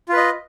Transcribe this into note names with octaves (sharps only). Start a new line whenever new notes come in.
F4 B4 D#5